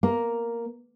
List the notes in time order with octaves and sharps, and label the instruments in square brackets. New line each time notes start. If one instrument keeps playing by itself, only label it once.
[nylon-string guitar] A#3